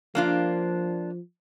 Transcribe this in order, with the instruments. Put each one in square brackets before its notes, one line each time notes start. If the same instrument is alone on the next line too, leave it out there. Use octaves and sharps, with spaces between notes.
[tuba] F3 [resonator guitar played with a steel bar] A#3 D4 F4